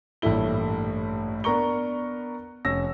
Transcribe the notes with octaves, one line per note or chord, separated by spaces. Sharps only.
A1 G2 A#2 A3 E4 G7
B3 D4 A#4 A#5 C#6 G7
F1 C#4 E6 A#6